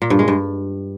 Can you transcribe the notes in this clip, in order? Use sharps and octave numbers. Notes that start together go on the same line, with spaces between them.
A#2
G2
G#3
G2